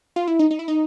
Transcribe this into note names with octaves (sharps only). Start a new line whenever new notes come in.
F4
E4
D#4
D#4
E4
D#4